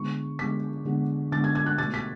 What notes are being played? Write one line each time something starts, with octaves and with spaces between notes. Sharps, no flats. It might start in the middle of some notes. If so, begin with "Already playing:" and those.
Already playing: D3 G#3 B3 C#6
D3 G#3 B3 B6
D3 G#3 B3
D3 G#3 B3 A6
G#6
G#6
F#6
B2 A3 A6
B6